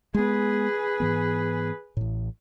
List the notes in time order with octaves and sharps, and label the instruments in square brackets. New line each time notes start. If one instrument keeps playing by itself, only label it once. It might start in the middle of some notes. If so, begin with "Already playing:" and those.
[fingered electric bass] G#3 B3 [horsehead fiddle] G#4 B4
[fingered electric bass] G#2 E3 B3
A1 A2